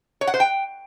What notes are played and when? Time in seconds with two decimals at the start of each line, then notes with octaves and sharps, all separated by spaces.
0.21 C#5
0.27 F#5
0.34 C5
0.40 G5